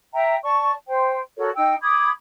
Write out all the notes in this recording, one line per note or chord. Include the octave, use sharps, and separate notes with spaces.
E5 G5 A#5
D5 A5 C#6
C5 G5
F#4 A4 A#4 C#5
D#4 G5 E6
B5 D6 D#6 G#6